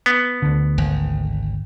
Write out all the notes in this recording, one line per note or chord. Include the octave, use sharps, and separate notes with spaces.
B3
D2 D3
G#1